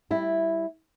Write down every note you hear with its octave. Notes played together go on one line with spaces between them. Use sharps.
G3 E4 E5